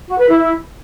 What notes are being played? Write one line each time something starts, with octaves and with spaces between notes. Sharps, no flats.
F#4
B4
E4